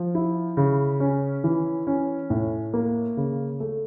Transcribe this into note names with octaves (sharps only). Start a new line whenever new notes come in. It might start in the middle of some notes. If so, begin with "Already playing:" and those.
Already playing: F3
E4
C#3
C#4
E3
C#4
A2
A#3
C#3
A3